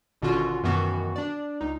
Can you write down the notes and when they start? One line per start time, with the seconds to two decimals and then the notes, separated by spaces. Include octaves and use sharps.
0.22 G#1 B2 D3 C#4 F4 F#4
0.63 F#2 B2 D#3 E3 B3 F#4
1.16 D4 D5
1.61 C#2 D#4